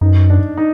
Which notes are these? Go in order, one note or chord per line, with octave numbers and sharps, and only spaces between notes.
F#2 D#4
D4
D#4